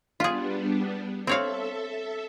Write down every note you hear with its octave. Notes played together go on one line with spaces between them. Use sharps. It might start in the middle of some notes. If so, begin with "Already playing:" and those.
G3 B3 D4 F4 G#4
C4 A4 C#5 E5 F5